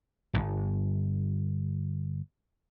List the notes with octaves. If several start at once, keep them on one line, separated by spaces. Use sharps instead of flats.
D1 G1